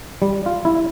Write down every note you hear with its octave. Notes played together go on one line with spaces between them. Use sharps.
G3
F4
E4